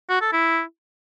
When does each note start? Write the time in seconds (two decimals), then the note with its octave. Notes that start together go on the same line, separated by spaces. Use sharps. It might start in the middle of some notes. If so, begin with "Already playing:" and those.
0.09 F#4
0.21 A4
0.33 E4